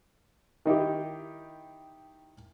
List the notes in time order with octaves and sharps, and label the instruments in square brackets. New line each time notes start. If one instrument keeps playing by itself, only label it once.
[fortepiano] D#3 D#4 E4 G4